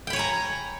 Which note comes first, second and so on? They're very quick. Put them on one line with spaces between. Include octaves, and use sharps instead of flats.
G5 B5 C#5 G#5 A#5